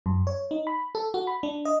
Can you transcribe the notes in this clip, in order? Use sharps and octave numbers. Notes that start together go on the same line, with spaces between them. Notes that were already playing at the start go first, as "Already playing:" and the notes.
F#2
C#5
D#4
B5
A4
F#4
B5
D4
D#5